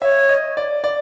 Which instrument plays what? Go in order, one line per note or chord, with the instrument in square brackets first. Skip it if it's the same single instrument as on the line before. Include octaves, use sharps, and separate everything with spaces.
[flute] C#5 [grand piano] E5
[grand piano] D#5
D5
D5